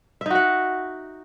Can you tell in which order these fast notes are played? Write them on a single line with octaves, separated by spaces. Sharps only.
E5 D#4 F#4 F#5